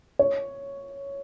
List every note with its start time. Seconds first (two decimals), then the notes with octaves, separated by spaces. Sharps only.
0.19 C#5